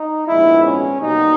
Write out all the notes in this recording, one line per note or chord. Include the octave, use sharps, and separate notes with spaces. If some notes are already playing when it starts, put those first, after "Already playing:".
Already playing: D#4
A#1 G#2 D#3 G#3 B3 E4
C#4
B1 B2 G3 A#3 D#4